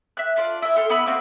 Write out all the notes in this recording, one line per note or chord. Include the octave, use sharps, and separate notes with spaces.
E5 F#6
D4 F4 D5
E4 E5
A4 C6 F6
B3 E4 B5 E6
A#3 C4 F#4